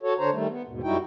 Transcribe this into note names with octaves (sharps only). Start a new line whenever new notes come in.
F#4 A4 C#5
D3 D4 C5 C#5 A#5
D#3 G3 A3
B3
D#2 G#2 B2
F#2 G3 D#4 E4 F#4 G5